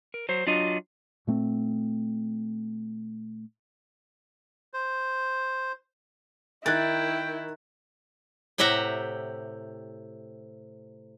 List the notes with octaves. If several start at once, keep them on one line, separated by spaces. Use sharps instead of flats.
A#4
F#3 C5
F#3 D4 F4 D#5
A#2 A3 C4
C5
D#3 E4 G5 F#6 G#6 A6
A2 C3 G4 E5 F#5 A#5